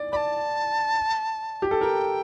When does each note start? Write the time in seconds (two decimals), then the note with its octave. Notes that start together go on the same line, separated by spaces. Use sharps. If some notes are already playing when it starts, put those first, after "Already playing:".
Already playing: D5
0.12 D5 A5 B5
1.62 G4
1.71 A4
1.81 A#4 G5